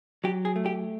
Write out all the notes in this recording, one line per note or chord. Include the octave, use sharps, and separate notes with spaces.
F#3 G4
G#4
A3
G4